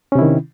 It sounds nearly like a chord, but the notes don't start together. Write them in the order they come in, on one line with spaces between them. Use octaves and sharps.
C#4 C3 E4 D#3